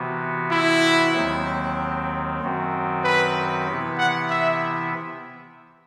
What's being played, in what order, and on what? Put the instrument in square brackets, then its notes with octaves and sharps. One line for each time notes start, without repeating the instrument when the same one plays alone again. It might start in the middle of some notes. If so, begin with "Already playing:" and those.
Already playing: [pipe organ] C3 E3 B3 F#4
[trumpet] E4
[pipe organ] D#2 D#3 F#3 C4
F#2 D#3 F#3 C4 F#4
[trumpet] B4
[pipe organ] C3 E3 B3 E4
[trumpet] F#5
E5